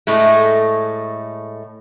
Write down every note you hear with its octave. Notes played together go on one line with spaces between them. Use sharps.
A2 G#3 A3